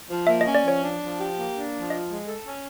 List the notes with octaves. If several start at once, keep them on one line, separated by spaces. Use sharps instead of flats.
F3
A#3 E5
D#5
C#4
D5
F3 C#5
D4
F3
G4
A#3
D4
F3
F4 D#5
G#3
A4
C#4